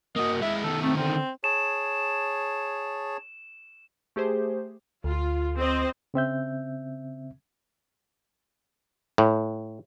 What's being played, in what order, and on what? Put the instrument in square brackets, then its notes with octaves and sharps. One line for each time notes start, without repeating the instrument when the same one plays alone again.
[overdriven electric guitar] A#3 F#4 [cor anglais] D#5
[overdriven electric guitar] G#3 E4 [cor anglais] E5
[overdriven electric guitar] D#3 B3 [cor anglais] A4
[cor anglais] A3 [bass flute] C4
[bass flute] D3 [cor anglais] C4
[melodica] G#4 C#5 A5 [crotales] E7
[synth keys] A3 G4 G#4 C5
[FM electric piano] D2 [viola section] F4
[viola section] C4 C5 D#5
[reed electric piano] C#3 C4 E5 G6
[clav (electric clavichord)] A2